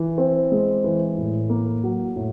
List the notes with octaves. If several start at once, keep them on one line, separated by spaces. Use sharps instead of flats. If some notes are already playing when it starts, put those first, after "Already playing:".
Already playing: E3
C4
G#3
E3
A2
A#3
F#3
A2